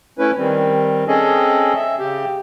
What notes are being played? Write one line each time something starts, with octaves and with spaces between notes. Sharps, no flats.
A3 C#4 E4 B4
D#3 G3 C4
C4 C#4 G#4 A4 D#5
E5
C#3 G4